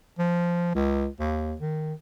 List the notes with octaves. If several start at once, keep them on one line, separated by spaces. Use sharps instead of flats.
F3
C#2
D#2
D#3